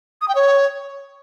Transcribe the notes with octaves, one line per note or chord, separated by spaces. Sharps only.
D#6
G5
C#5